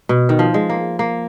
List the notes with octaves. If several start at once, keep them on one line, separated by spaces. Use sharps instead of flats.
B2
D#3
F3
G#3
A#3
A#3